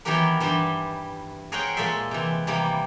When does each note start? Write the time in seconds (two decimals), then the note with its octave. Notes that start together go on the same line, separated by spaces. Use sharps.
0.05 D#3 E3 F#3 B3 G4 A#4
0.40 G2 E3 G3 G4 C6
1.52 G#4 A#4 C5 C#5 F#5 G5
1.77 A#2 G#3 A#3 A4 E5 C6
2.11 C3 E3
2.47 C3 D#3 E3 G3 A#3